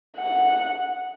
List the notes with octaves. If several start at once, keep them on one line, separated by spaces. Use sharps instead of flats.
F#5